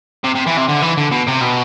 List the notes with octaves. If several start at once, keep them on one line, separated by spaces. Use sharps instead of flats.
C3
C3
E3
C3
D3
E3
D3
B2
C3
B2